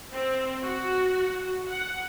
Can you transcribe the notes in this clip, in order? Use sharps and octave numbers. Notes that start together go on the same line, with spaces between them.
C4
F#4
F#5